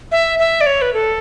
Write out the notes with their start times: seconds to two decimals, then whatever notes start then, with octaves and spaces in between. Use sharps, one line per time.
0.12 E5
0.39 E5
0.61 D5
0.66 C#5
0.82 B4
0.94 A4